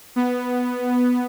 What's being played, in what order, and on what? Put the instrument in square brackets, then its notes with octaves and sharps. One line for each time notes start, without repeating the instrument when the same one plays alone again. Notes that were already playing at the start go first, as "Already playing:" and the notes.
[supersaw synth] B3